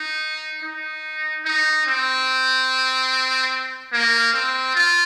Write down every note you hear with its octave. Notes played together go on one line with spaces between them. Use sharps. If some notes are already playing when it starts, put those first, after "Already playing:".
Already playing: D#4
D#4
D#4
C4
A#3
C4
F4